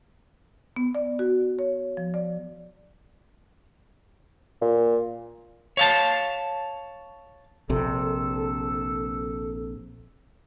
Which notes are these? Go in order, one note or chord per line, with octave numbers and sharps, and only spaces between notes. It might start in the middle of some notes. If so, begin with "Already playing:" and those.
B3
D5
F#4
C#5
F3
D5
A#2
C#5 F5 A5
A#1 C3 A4